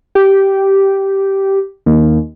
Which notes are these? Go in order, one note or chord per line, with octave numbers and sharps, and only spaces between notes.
G4
D#2